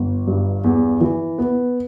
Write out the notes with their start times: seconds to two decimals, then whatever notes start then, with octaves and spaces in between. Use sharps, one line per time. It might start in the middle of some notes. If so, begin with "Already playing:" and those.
Already playing: G1
0.27 G2
0.64 E2
1.01 E3
1.38 B3